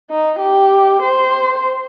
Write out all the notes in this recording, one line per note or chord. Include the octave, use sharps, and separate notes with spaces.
D#4
G4
C5